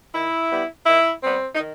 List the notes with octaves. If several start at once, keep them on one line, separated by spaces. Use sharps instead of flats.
D#3 E4
G3 B3
D#3 E4
G3 B3 C4
D#4
D#3